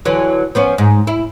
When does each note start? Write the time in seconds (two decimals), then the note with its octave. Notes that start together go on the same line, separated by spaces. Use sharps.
0.05 D3 E3 F#3
0.55 F3 B3 C#4
0.78 G#2
1.07 E4